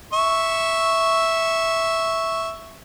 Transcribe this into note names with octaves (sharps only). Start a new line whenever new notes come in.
E5 C#6